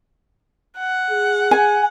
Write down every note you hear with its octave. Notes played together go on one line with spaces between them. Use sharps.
F#5
G#4
G#5